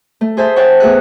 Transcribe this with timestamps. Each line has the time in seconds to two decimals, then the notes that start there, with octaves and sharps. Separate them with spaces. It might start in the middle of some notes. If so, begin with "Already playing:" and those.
0.21 A3
0.37 G#4 C5 E5 A5
0.56 C#5 E5 F#5 G5 A5
0.80 E2 A3 G#4 E6 F#6